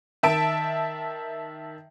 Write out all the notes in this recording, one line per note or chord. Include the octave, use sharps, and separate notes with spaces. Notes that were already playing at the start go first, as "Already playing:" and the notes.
D#3 E5 A5 D7